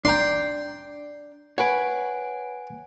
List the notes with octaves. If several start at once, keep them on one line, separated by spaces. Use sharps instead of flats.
D4 D5 G5 A#5 C6
B4 C#5 F#5 G#5 D7